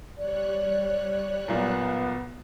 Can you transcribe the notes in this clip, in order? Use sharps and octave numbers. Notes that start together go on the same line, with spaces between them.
G3 C#5 D5 F#6
B1 A#2 B3